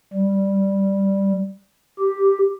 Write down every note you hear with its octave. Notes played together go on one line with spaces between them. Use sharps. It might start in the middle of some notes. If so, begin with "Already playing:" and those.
G3
G4